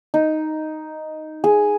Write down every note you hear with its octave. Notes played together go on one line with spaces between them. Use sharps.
D#4
G#4